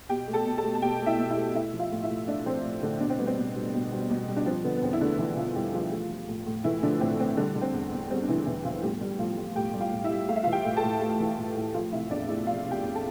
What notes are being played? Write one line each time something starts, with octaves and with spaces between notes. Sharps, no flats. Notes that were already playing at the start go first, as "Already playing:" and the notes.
B2 G4 G5
A3
A4 A5
B2
A4 A5
A3
A5
B2 G4 G5
A3
E4 E5
B2
E4 E5
A3
A3 E4 E5
F3
F4 F5
A2
E4 E5
A2
A3 D4 D5
F3 C4 C5
A2
A2 D3 D4
B2 D4
C4
G3 B3
C4
B2
G3
B2
G3
B2
G3
D4
F3 C4
D3 B3
B3
E2 C4
E4
D3 A3 D4
E3 F3 E4
D3 F3 F4
E2 G3 G4
F3 A3 F4
A3
F3
A2
A2
E3 A3 E4
D3 F3 D4
A2 C4
A2 C4
D3 G3 D4
D3
C4
E2
E2
G3 C4
D4
D3 E3 E4
E2 E3 E4
E2 F3 F4
A2 G3 G4
G3 G4
A2 F3 F4
G3
A2 G4 G5
G3
F4 F5
A2
E4 E5
G3
A3 F5
E5
F4 F5
E3
G4 G5
A2
A4 A5
A2
A3
E3
A2
A2
F3 F4 F5
C3 E4 E5
E2 D4 D5
A3 E4 E5
F3 F4 F5
C3
G4 G5
E2
A4 A5